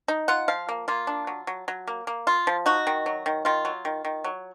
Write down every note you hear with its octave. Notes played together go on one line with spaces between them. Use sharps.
D#4
F4 F#5
F3 F5
A#3
A#3 F4
D4
F#3
F#3
F#3
A#3
A#3
F4
F3
D#4 F#4
D#3
F#3
D#3
D#3 F4
F#3
D#3
D#3
F#3